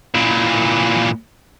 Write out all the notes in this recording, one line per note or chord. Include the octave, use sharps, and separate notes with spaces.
A#2 E3